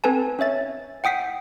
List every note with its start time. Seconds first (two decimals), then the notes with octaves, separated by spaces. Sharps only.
0.04 C4 A4 B4 G#5 A5
0.39 C#4 C#5 E5 A6
1.04 F#5 G5 D#6 B6 C7